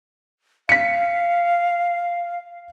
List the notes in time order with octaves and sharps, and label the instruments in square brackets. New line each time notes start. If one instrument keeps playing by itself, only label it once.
[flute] F5 [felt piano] B6 C#7